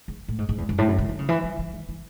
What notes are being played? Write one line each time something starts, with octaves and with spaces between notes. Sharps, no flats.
E2
A2
G#2
G#2
E2
F#2
A2
F#2
C#3
D#3
C#3
E3
F#3
E3
D#3
E3